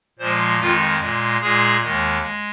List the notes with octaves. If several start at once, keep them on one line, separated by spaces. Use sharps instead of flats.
A#2 F3 G#3 C5
F2 D#3 G#3 F4
A#2 G#3
A#2 G#3 G#4
D#2 D#3 G#3
G#3